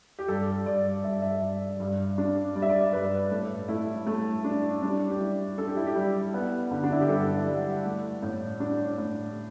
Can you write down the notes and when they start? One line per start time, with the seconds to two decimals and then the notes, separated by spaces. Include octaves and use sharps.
0.19 G4
0.28 G2 A4
0.66 G2 D5
1.04 G2 E5
1.22 E5
1.42 G2
1.80 G2
2.18 D4
2.55 G3 D5
2.62 E5
2.69 D5
2.93 G2 B4
3.31 A2 A4
3.68 A3 E4
4.06 A3
4.44 D4
4.82 G3 D4
5.10 G4
5.20 G3 E4
5.58 D4 A4
5.68 G4
5.77 E4
5.87 G4
5.95 G3
6.34 B3
6.71 D3
6.83 D4
6.92 E4
7.01 G4
7.09 G2 A4
7.38 E5
7.46 G3 D5
7.85 A3
8.22 A2
8.60 D4
8.98 A2